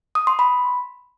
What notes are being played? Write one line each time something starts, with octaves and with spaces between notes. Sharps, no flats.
D#6
C6
B5